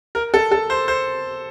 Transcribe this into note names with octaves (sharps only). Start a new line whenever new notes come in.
A#4
A4
A4
C5
C5